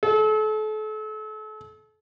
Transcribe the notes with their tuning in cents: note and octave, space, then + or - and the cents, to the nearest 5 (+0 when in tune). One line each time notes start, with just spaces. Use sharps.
A4 -35